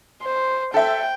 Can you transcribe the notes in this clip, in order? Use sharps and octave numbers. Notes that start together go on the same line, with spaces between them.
C5
A4 E5 G5